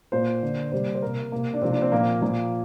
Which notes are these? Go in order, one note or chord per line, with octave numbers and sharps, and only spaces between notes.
A#2 A#3 C5
D3 A#3
C3 G3 A#3 C5
C5
C3 A#3 A#4
C3 A#3
D4
C3 F3 A#3 C4
D4
C4
A#2 F3 A#3
A#2 F3 A#3